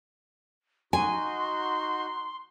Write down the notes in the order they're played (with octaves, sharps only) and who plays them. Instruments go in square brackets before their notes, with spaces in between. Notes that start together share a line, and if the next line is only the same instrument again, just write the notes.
[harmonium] D#4 F#4 [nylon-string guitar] G#5 [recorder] C6